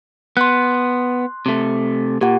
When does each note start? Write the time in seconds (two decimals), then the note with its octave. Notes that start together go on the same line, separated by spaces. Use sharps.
0.37 B3 C6 F#6
1.46 C3 A3
2.21 A#2 G4 F#5